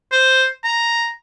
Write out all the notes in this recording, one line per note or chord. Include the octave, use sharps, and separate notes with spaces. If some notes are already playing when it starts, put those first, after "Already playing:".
C5
A#5